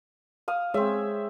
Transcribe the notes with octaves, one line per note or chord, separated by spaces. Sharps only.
F5 D#6
G#3 C4 G#4 C#5 E5